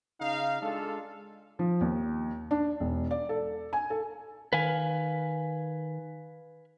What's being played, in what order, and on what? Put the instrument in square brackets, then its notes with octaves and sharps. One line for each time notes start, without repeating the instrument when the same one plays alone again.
[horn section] C#3 D#4 F5
G#3 D4 F4 A4
[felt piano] F3
D#2
D4
E1
D5
A4
G#5
A4
[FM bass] D#3 [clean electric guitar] B4 F5 G#5